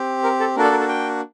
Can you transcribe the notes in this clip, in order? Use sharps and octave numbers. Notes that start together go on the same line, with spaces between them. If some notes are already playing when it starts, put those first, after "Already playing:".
Already playing: C4 G4
A#4
A4
A#3 D4 F#4 A4 A#4
D5
A#4
A4
G5